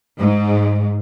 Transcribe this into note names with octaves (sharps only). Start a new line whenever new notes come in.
G#2